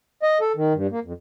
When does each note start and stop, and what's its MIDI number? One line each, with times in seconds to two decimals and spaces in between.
0.23 0.38 75
0.41 0.52 69
0.56 0.73 51
0.74 0.87 43
0.91 1.00 58
1.04 1.13 41